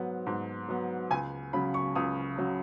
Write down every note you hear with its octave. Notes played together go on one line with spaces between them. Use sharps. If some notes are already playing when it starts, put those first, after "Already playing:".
Already playing: G#2 F#3 B3
G#2
F#3 B3
C#2 G#5
C#3 F#3 B5
C#6
C#2 D#6
C#3 F#3